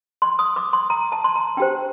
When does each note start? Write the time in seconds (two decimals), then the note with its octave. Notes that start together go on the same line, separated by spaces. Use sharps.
0.22 C6
0.39 D#6
0.56 D6
0.73 C6
0.90 A#5
1.12 A5
1.24 C6
1.36 A#5
1.57 D4 G4 C5 G5